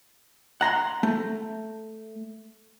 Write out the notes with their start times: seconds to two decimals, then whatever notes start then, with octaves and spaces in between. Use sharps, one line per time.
0.61 F#5 A#5 C6
1.03 A3